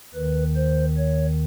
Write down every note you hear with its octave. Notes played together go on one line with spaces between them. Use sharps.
D#2 D#3 B4
C5
C#5